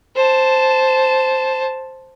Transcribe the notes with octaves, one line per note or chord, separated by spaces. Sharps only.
C5 A5